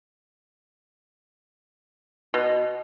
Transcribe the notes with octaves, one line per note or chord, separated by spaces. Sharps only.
B2